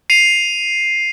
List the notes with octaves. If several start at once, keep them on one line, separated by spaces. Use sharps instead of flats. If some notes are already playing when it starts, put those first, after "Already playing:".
C7 D#7 F7